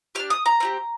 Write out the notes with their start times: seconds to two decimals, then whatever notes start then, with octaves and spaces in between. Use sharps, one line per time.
0.15 D4 G4 F6
0.30 D#6
0.46 A#5
0.60 C4 D#4 G4